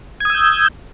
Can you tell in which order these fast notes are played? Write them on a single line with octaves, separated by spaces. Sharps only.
G#6 D#6 E6 G6